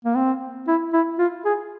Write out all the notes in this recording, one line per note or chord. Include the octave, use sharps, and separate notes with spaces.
A#3
C4
E4
E4
F4
G#4